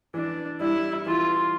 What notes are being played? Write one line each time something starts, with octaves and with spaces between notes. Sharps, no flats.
E3 D4
G3 E4
E3 F4